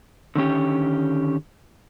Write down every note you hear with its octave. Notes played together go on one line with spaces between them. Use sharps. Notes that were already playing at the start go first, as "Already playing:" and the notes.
D3 D#3 C#4 G4